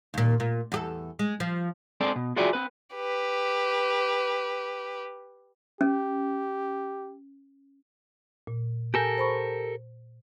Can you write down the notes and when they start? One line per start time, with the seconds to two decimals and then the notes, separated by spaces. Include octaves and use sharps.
0.14 D#2 A#2
0.40 A#2
0.72 E2 G4 A4
1.19 G#3
1.40 F3
2.01 G#3 C4 A4 D5
2.16 B2
2.36 F4 F#4 G#4 D5 E5 G5
2.53 C4 B4
2.95 G4 B4
5.81 C#4 G4
8.47 A#2
8.94 G4 A4 A#4 G#5 G6
9.18 C5 B5 C#6